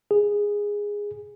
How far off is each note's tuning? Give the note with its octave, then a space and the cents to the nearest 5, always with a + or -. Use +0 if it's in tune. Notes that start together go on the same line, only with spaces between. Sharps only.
G#4 -10